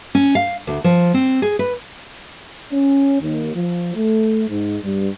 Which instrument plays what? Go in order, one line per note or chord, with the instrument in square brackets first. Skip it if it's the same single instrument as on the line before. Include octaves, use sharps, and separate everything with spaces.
[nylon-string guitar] C#4
F5
D2
F3
C4
G#4
B4
[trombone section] C#4
D#2
F3
A3
G#2
G2